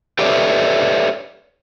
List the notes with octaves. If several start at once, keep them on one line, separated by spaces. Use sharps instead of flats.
G4 A4 B4 C#5 D5 E5